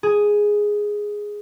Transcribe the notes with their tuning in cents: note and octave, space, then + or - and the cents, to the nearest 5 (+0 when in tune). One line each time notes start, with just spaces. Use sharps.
G#4 +0